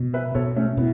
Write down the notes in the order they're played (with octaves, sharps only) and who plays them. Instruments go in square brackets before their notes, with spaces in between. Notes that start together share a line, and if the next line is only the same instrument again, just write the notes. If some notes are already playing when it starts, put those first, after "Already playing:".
Already playing: [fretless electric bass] B2
[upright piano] B4 E5
[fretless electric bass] B2 [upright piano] A4 C#5
[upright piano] A3 C#4
[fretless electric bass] B2 [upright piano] B3 E4